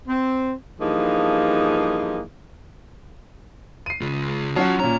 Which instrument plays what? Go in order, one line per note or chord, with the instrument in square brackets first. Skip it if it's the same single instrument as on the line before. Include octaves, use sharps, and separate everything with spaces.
[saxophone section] C4
G2 E3 F3 A#3 D#4 G#4
[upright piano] C7 D#7
[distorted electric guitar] C#2 F4
[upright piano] F#3 C#4 F#4 [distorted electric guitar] F4 A5
[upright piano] A#2 C#4 [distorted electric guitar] A#5